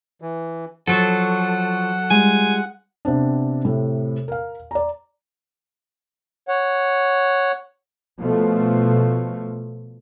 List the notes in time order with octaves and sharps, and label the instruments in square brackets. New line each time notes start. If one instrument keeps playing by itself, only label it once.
[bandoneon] E3
[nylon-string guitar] F3 [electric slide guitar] F#3 A4 [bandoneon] F#5
[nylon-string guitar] G3 G#3 F4 [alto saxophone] G#5
[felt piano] C3 B3 C4 D4
A2 C3
A#4 F5
D5 A#5
[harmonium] C#5 F#5
[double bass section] B2 F3 A3